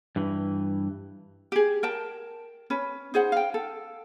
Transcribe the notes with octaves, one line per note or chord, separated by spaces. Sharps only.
G2 E3
G4 G#4
A#4 G5 A5
C#4 B4
D#4 G#4 C5 F#5
F5 G5
A4